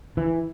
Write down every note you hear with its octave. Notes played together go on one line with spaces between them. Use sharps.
E3